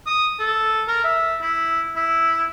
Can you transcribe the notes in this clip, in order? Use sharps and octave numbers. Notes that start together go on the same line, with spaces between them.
D#6
A4
A#4
E5
E4
E4